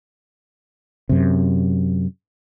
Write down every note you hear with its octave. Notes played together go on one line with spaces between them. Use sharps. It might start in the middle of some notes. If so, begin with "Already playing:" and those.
F#2 C3